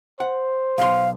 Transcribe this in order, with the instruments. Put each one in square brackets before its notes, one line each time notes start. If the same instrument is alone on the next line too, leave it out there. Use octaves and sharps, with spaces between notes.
[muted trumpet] C5 [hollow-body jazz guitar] F#5
[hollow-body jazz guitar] B1 C6 [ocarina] F5